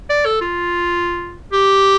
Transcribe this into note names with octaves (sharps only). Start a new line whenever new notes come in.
D5
A4
F4
G4